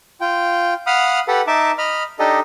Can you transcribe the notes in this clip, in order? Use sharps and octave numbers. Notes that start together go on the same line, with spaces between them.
F4 G5
F5 F#5 B5 D#6 F6
G4 A4 B4 F#5
D#4 E5 A5 D6
D#5 B5 F6
D4 D#4 G4 A4 D#5